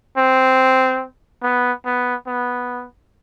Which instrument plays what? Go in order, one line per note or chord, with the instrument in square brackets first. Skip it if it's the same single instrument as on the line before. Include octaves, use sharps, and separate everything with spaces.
[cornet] C4
B3
B3
B3